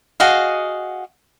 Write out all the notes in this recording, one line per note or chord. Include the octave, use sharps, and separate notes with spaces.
F#4 G#4 D#5 F5